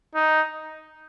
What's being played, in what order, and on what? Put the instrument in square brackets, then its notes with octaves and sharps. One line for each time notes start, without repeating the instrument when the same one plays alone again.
[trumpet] D#4